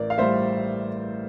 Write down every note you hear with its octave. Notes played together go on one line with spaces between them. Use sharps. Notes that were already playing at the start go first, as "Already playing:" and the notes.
Already playing: A1 A#4 D5
F5
A2 G3 C5 E5